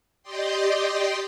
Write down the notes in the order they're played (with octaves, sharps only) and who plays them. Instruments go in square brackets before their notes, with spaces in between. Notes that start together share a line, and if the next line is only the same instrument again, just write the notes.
[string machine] G4 D5 D#5 G5 C6